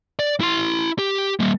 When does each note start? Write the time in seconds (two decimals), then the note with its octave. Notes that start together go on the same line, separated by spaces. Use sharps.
0.19 D5
0.41 E4 C6
0.99 G4
1.40 G3 A#3